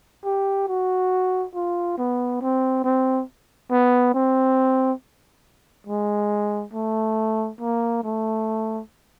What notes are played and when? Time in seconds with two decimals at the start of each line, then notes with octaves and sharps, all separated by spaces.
0.25 G4
0.68 F#4
1.55 F4
1.98 B3
2.42 C4
2.84 C4
3.71 B3
4.14 C4
5.87 G#3
6.73 A3
7.60 A#3
8.04 A3